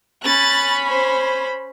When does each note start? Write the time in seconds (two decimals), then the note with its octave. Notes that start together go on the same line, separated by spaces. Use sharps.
0.24 C#4 B5 F#6 A6
0.88 C5